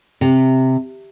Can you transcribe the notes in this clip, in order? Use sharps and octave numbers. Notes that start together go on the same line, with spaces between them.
C3